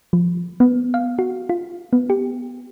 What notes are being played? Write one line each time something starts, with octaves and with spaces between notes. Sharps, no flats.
F3
B3
F5
F#4
F4
B3
G4